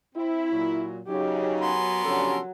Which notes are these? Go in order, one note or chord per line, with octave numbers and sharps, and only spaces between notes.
C4 E4
A#2 F#3
C#3 F#3 D#4 G4
B3 A#4 G#5 C6
C#3 F3 F#3 C#4 D4 G4 A4